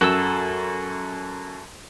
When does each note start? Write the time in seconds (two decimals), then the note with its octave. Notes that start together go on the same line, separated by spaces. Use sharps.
0.01 F#2 F#4 A4 E6